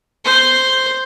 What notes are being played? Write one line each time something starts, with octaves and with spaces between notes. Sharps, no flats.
C5